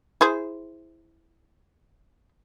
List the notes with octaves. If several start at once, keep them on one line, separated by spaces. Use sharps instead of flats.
E4 G#4 C5